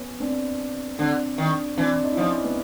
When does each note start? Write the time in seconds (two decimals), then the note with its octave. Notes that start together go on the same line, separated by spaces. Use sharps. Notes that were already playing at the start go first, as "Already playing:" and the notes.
Already playing: B3 C#4
0.20 C4 D4
0.99 D3 C4 D4
1.38 D#3
1.77 E3 C4 D4
2.04 D#4
2.12 E4
2.17 F3 C#4 D#4
2.44 B3